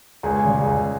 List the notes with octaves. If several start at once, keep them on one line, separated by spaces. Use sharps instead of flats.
C#2 G#4
C#3 G3
C#2